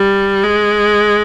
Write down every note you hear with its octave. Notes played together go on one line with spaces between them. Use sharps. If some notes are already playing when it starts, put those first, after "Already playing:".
Already playing: G3
G#3